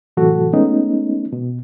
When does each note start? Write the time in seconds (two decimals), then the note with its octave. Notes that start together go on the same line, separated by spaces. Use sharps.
0.17 A2 C3 E3 F#3 F#4 A4
0.53 G#3 A3 B3 C#4 D#4
1.33 B2